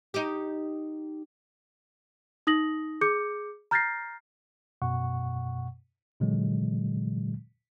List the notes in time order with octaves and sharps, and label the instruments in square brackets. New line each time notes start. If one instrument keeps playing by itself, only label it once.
[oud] D#4 G4
[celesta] D#4 D#6 A#6 F#7
G#4 D6 G6 C#7
A#5 F6 G6 A6 A#6 C7
[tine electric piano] F#2 B2 F#5 C#6
A#2 D3 E3 F#3 G#3